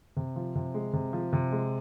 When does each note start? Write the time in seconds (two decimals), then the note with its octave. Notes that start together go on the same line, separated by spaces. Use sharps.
0.17 C3
0.36 F3
0.55 C3
0.74 G#3
0.93 C3
1.13 F3
1.33 C3
1.52 G#3